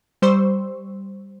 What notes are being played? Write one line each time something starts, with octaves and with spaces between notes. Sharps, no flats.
G3 C5 C6 C#6 E6